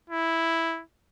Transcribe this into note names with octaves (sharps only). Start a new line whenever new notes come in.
E4